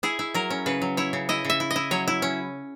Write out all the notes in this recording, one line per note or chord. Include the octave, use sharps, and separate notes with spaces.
E4 G#4
E4
F#3 A#4
C#4
C#3 B4
F#3
E4 C#5
C#3
E4 D#5
C#3
E5
E4
D#5
E4
F#3 C#5
E4
C#4